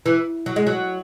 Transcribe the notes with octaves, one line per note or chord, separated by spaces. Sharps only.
E3
F#3
G#3
F#3